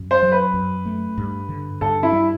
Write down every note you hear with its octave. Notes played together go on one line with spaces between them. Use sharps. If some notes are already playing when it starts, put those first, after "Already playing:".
Already playing: F#2
C5
F#3
B4
F#2
A3
G2
D3
G2 A4
E4
G3